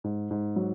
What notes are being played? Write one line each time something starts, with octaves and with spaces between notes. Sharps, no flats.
G#2
G#2
F#3